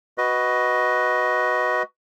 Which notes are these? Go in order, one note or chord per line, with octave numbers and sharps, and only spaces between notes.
F#4 B4 D#5